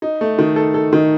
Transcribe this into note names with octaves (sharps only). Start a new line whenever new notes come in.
D#4
A3
D#3
A4
A4
D#3